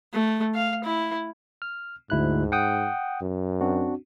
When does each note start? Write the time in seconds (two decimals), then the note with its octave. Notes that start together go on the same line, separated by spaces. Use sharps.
0.13 A3
0.55 F5
0.84 E4
1.62 F6
2.10 D2 G#2 E4 F#6
2.52 F#5 G5 D#6
3.22 F#2
3.61 C4 D4 F#4